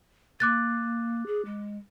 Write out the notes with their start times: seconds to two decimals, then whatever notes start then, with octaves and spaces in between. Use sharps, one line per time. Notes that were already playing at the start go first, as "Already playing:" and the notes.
0.40 A#3 D6 F#6 A6
1.26 G#4
1.45 G#3